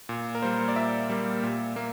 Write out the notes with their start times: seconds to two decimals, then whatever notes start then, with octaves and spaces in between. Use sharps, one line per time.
0.09 A#2
0.35 A#4
0.42 G3 A#3 C5
0.68 D5
0.76 A#2 E5
1.10 G3 A#3
1.43 A#2
1.76 A#3